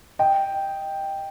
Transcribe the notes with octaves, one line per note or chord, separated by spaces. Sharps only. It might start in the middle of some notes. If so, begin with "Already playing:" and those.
D#5 G5